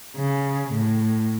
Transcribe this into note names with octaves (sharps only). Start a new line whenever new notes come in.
C#3
A2